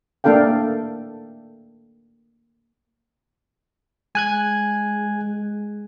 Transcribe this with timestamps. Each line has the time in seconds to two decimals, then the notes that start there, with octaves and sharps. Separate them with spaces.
0.24 A3 A#3 D4 A4 F5 G5
4.15 G#3 G#5 F#6 G#6